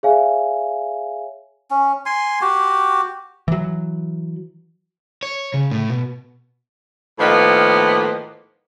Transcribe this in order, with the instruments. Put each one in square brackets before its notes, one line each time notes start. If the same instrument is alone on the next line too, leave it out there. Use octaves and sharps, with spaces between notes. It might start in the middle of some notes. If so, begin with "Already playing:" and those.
[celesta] G#4 C#5 E5 F5 G#5
[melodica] C#4
G#5 C6
F#4 G4
[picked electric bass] E3 F#3
[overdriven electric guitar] C#5
C#3
A2
B2
[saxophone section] A2 D#3 F3 A#3 B3